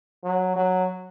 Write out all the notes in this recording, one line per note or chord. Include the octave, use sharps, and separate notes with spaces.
F#3
F#3